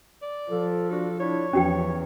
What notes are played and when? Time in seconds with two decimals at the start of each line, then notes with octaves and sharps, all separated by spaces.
0.22 D5
0.51 F3 A4
0.90 D4 F#4 A4
1.20 D4 E4 C#5
1.53 E2 F3 C#4 F#4 G5